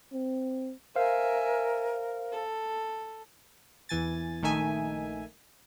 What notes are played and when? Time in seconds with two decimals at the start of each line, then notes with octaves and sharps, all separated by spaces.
0.13 C4
0.96 A#4 C5 E5 F5 G#5
2.32 A4
3.89 E2 E3 G#5 A6
4.42 A#1 D#3 A3 D#4 E5 G#5